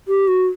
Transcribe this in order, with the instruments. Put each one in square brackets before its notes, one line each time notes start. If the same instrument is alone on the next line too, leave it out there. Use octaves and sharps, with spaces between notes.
[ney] G4
F#4